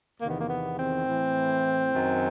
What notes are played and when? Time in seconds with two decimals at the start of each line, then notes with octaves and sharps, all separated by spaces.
0.20 E2 C3 D#3 A#3
0.30 B3
0.39 A#3
0.49 B3
0.77 C4
1.07 A2 E3
1.93 F#2 D#3